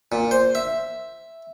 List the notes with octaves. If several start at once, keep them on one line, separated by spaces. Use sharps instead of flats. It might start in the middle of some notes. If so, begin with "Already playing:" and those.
A#2
C5
E5